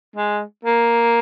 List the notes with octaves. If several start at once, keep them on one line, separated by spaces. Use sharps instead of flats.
G#3
A#3